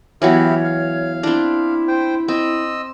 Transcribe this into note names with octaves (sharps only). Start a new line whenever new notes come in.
E3 F#3 B3 E4 G4 C#5 F5
F5
C4 D4 E4
C5 G5
C4 D#5 E6